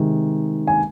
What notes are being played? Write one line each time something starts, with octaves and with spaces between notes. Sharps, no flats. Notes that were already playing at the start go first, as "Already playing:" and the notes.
Already playing: C3 D#3 G#3
G#5